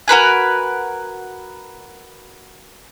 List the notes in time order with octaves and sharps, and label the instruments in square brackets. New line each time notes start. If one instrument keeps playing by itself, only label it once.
[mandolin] F#4 A#4 B4 G#5